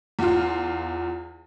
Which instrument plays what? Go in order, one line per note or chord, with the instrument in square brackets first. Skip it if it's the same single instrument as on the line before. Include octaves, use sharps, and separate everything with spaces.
[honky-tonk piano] E2 F4